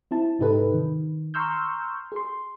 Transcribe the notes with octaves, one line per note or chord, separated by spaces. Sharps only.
C4 E4 A5
G#2 C3 D#4 G4 A4 B4
D#3
A#5 C6 C#6 E6 F6 G6
G#4 C6